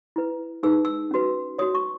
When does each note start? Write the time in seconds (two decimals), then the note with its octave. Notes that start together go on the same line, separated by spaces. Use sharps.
0.16 E4 B4
0.63 D#4 G#4 B4 E6
0.85 E6
1.11 C#4 F#4 B4
1.58 C#5 D#6
1.62 F#4
1.75 C#6